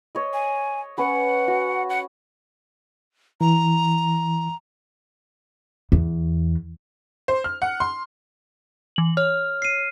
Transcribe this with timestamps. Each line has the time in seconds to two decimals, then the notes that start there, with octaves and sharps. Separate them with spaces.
0.15 C#5 D#5
0.33 G#5
0.98 C#4 B4 F#5
1.48 F#4
1.90 F#5
3.41 E3 A#5
5.92 E2
7.28 C5
7.44 F6
7.62 F#5
7.80 C6
8.96 E3 F#7
9.17 C#5 F6
9.62 C7 D#7